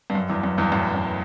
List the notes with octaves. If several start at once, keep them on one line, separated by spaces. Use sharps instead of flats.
G2
F#2
E2 G2
F#2
E2 G2
F#2 A2
F#2